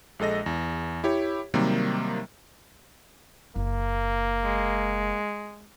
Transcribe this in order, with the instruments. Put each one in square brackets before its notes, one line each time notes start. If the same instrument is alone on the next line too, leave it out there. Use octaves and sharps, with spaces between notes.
[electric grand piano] A#1 G#3 A4 D#5 A#6
E2
E4 G4 C#5
C3 D#3 F#3 G3 A#3
[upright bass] F#1 [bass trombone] A#3
[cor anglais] G#3